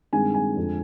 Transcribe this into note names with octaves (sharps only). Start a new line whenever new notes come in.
G2 D#3 G#3 C4 G#5
G#5
F2 D3 G#3